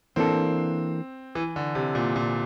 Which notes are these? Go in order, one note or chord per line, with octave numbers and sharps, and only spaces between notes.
E3 A#3 C4 D4 A4
E3
D3
C3
A#2
A#2